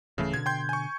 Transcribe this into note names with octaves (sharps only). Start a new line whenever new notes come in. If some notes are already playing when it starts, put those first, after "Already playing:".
D1 C#3 E3 A3
B2 D3 G#6
G5 C6 G6
G#5 C#6